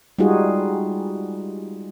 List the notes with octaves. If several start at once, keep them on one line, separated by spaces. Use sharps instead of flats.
G3 G#3 D#4 F4 F#4 G#4